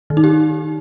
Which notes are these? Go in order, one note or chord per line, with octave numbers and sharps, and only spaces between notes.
D#3
D#4
G4